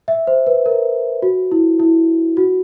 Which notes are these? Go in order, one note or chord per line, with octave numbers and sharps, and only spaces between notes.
E5
C5
B4
A#4
F#4
E4
E4
F#4